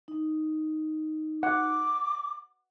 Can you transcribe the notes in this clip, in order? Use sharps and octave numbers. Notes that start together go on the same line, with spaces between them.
D#4
F#5 D6